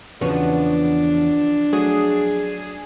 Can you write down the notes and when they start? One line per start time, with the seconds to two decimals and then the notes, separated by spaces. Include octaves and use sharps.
0.21 E2 C#3 F3 B3 D4 F#4 C#5
1.73 F#3 A3 F#4 G#4